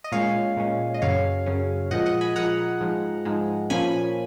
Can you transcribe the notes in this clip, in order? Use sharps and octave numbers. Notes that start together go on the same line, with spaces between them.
D#5
A#2 G#3 C#4 C#5 F5
A#2 G#3 C#4
D#5
F#2 C#3 F#3 C#4 C#5 F5
F#2 C#3 F#3 C#4
A#2 F3 G#3 D#5 F#5
D#5 F#5
G#5 B5
A#2 F3 G#3 F#5 A#5
G#2 F3 G#3
G#2 F3 G#3
A#2 F3 A#3 C#4 G#5 B5